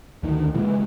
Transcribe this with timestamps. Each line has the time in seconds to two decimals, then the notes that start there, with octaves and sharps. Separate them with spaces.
0.23 D2 D3 D#3
0.54 A#2 C#3 E3 G#3